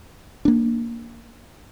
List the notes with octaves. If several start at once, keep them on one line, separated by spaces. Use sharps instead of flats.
A#3 D4